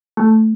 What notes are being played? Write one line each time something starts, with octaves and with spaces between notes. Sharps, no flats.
A3